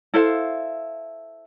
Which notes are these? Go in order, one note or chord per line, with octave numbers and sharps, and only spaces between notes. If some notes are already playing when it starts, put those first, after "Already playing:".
E4 A4 C5 F5